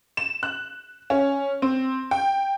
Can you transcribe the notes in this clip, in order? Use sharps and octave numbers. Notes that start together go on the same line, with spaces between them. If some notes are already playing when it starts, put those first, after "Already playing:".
E7
F#6
C#4
C4
G5